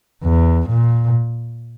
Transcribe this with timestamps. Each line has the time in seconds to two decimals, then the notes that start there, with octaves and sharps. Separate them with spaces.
0.24 E2
0.69 A#2